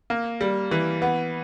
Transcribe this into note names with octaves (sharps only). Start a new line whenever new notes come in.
A#3
G3
E3
B3